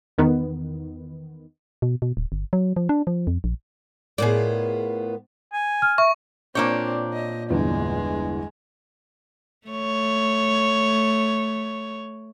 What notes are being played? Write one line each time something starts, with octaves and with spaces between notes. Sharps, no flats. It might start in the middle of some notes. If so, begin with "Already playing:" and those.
E2 D#3 B3
B2
B2
D1
G1
F#3
F3
D4
F3
F2
A#1
A2 B3 F4 G#4 A#4 D5
G#5
F6
E5 C#6
A#2 A#3 C4 D4 C#5 G6
D#5
G1 E2 G#3
A3 C#5